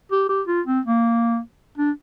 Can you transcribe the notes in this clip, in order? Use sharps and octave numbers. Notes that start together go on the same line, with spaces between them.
G4
G4
F4
C4
A#3
D4